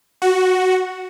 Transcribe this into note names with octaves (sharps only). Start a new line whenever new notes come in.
F#4